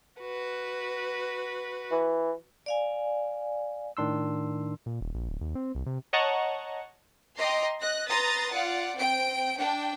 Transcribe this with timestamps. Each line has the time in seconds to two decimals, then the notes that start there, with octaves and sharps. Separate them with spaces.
0.19 F#4 B4
1.91 E3
2.66 D5 F5 G#5
3.97 A2 D#3 D4 C6 E6
4.86 A#2
5.01 D#1
5.14 A#1
5.29 D1
5.41 D#2
5.55 C4
5.75 C2
5.86 C3
6.13 C#5 D#5 F#5 A5 A#5 C#6
7.36 D#5 G5 A#5 C6 D6
7.80 D#5 F#6 A#6
8.08 B4 A#5 C6 D#6 A6
8.51 F4 D5 F#5
8.97 C4 G5 D7
9.56 D4 G5